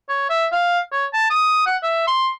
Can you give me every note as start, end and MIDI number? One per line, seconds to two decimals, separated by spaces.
0.09 0.29 73
0.30 0.46 76
0.52 0.80 77
0.92 1.06 73
1.14 1.27 81
1.30 1.64 87
1.66 1.77 78
1.83 2.07 76
2.07 2.30 84